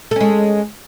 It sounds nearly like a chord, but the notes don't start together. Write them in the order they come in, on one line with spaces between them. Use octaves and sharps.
A4 C#4 G#3